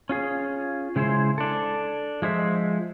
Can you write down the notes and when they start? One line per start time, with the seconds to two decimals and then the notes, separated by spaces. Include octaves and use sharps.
0.09 C#4 F4 G#4
0.96 C#3 G#3 E4 G#4 C5
1.38 D4 A4
2.22 F3 G#3 C5 E5